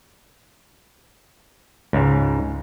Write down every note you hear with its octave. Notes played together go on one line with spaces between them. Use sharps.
C#2 G#2